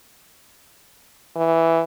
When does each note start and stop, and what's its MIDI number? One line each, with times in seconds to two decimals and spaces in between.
1.36 1.82 52